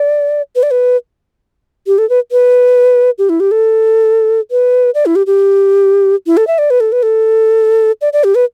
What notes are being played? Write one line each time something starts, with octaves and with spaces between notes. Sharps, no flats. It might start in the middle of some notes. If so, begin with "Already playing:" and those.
Already playing: D5
B4
D5
B4
G4
A4
B4
B4
G4
E4
G4
A4
B4
D5
E4
G4
G4
E4
A4
E5
D5
B4
A4
B4
A4
D5
D5
G4
B4